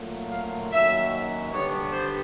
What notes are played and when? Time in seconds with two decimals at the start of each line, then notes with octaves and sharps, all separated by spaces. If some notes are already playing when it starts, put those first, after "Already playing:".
Already playing: A#2 F#3 A3
0.31 F5
0.71 F#2 D#3 F#3 A#3 E5
1.52 G2 D3 G3 B3 D4 C#5
1.93 C5